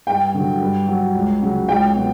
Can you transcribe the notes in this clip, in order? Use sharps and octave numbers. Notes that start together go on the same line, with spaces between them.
G2 G5
D3 F#3
G2
F#3
C#2
C#3 F#3
C#2 G5
B2 F#3